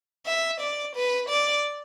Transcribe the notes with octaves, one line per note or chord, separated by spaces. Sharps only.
E5
D5
B4
D5